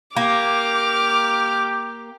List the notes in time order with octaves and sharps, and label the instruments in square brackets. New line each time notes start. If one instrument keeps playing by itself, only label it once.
[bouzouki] A#3 [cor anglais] G4 [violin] D6 F6